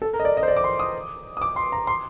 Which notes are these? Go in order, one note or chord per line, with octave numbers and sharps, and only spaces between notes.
A4
A#4
D#5
D5
D#5
C5
D5
D6
C6
D#6
D#6
D6
C6
A#5
C6